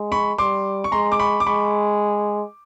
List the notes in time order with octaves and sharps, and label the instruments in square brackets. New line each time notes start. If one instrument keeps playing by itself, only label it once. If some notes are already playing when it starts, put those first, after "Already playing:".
Already playing: [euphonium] G#3
[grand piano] B5 C#6
[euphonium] G3 [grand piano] C6 D6
[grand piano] C#6
[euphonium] G#3 [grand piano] A#5 C6
[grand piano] D6
B5 C#6
D6
[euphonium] G#3 [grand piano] B5 C#6